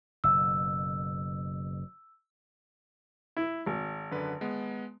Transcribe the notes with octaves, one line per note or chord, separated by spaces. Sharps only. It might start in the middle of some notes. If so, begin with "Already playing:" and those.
F#1 B2 E6
E4
G#1
F#2 D3 B4
G#3 B3